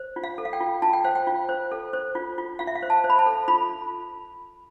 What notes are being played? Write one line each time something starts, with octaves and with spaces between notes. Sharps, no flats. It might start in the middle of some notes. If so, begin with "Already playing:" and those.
Already playing: C5
F4
F5
A4
F5
G5
F4
F4 A5
G5
C5 F5
G5
F4
C5
A4
C5
F4
F4
F4 F5
E5
F5
C5
A5
C5
B5
A5
A4
F4 B5